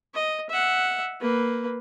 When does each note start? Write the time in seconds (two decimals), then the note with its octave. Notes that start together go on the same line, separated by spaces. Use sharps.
0.14 D#5
0.49 E5 F#5
1.20 A#3 B4